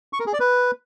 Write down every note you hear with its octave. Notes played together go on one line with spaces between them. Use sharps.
C#6
A#4
G#4
D5
B4